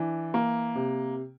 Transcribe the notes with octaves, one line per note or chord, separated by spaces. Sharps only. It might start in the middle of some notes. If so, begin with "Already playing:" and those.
Already playing: E3 D4
A#3
C3